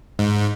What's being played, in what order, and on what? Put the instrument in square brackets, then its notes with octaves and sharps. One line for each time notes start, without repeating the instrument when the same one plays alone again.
[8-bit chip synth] G#2